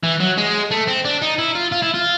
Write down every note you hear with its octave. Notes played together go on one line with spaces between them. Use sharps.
E3
F#3
G#3
A3
C4
D4
D#4
E4
F4
F4
E4
F4